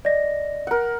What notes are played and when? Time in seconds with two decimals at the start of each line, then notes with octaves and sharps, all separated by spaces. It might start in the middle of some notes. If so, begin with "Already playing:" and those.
0.05 D5 D#5 A#6
0.67 A#4 F#5